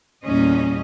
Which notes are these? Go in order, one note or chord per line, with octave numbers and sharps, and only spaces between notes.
E2 A#2 G3 C#4 D#5